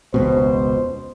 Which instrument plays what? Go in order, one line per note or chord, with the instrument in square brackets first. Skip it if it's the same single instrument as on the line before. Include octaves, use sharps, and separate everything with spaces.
[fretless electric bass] E1 C#2 B2 [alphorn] C5